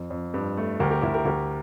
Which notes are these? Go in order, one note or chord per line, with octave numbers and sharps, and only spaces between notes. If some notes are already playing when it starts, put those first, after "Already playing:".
Already playing: F2
F2
G2
A3
D2 G4 A#4
G4 A#4
D2 E4 G4
G4 A#4
D2 G4 A#4